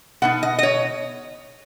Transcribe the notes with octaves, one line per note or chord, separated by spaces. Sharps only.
B2 B3 D#4 F#5
D#5
D#5
C#5